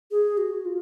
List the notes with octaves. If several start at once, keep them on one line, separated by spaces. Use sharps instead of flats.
G#4
F#4
F4